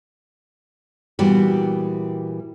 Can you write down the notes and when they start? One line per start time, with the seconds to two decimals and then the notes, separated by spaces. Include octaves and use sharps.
1.19 A#2 E3 G3 B3 F#4 G4